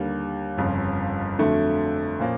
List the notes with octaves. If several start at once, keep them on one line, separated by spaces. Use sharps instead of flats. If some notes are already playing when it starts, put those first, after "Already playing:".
Already playing: D#2 D3 G3 A#3
G1 F2 C#3
F2 D3 F#3 A3
A#2 F3 A#3 C#4